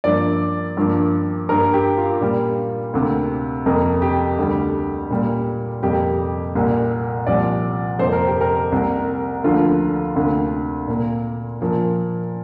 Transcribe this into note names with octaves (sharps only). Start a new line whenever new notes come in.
G2 F3 A#3 D5
G2 F3 A#3
G2 G3 A#3 A#4
G4
F4
A#2 G3 A#3
D2 C3 A#3
F2 C3 A#3 A#4
G4
D2 D3 G3
A#2 G3 A#3
F2 C3 G3 A#3 G4
C2 A#2 A#3
C2 A#2 F3 D5
F2 C3 A#3 C5
A#4
G4
A#4
C2 C3 A#3
D2 D3 F3 A#3 F4
D2 C3 A#3
A#2 A#3
A#2 F3 A#3